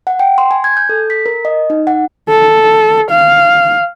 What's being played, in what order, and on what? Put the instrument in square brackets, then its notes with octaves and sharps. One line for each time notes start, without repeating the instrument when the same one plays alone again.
[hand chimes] F#5
G5
C6
G#5
G#6
G6
A4
B6
A#4
D#5
D#4
F#5
[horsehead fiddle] A4
F5